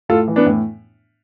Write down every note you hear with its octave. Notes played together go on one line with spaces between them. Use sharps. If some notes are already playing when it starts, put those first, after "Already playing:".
A2 F4 A4
E3
B3 D4
A2